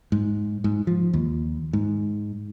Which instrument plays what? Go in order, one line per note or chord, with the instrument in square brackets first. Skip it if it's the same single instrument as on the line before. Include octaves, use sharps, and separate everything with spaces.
[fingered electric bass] G#2
G#2
F3
D#2
G#2